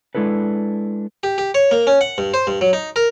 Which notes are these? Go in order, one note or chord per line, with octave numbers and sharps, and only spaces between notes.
G#3 D4 E4 A4 B4
G4
G4
C#5
A#3
C#4
F#5
G2
C5
G2
F#3
D#4
A#4